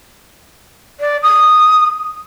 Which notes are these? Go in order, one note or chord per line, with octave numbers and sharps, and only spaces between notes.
D5
D#6